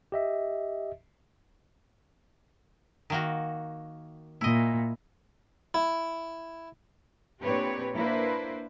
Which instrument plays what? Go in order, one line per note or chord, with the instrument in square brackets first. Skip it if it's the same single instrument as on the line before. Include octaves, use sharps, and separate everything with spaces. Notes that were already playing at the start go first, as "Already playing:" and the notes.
[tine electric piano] G4 D#5 E5
[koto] D#3 A#3 F#4
[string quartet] A#2 [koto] E4 D#5
[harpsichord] E4
[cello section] A#2 C4 D4 G4 B4 C#5
A#3 D4 E4 B4 C5